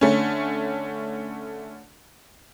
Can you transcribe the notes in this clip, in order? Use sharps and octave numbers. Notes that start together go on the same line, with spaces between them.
D3 A3 C#4